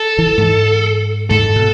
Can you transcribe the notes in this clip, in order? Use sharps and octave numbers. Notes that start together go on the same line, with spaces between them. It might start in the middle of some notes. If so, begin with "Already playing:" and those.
Already playing: A4
E3
G#2
G#2 A4
B2